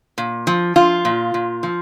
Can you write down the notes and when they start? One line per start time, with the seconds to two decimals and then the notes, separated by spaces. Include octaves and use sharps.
0.18 A#2
0.47 F3
0.76 F3 F4
1.05 A#2
1.34 A#2
1.63 F3